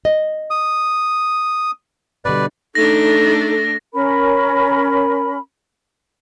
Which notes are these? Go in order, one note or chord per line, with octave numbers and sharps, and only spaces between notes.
D#5
D#6
B2 D3 G3 B4 D5
A3 D4 D#4 A4 A#6
C#4 A#4 B5